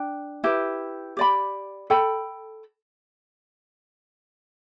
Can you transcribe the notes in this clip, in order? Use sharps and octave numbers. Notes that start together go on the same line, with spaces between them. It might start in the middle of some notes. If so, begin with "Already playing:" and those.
Already playing: D4 G5
E4 G4 B4
G4 D5 B5
A4 G5 B5